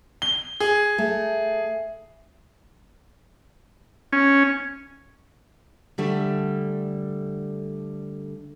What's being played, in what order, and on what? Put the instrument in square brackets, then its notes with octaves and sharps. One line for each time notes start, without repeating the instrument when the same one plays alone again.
[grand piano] G7
G#4
[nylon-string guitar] A3
[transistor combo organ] C#4
[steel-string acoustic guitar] D3 G3 A3